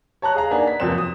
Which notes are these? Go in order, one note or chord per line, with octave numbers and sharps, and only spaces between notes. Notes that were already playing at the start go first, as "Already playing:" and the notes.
C#5 A5 A#5 F#6
G#4 F5 A#5
A#3 D4 D#4 B4 F#5 G#5
B6
F1 F2 F#3 A#3 C4 E7
D#6